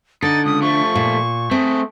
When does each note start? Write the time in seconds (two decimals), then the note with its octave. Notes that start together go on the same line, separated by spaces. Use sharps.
0.22 D3 D#4 A6
0.45 C#2 D#6
0.62 F3 A3 C#6
0.95 A#2
1.51 A3 C4 G#4